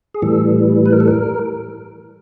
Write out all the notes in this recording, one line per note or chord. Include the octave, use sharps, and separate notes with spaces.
G#4
A2 E3 G3 A4
B4
A#4
A4
A#4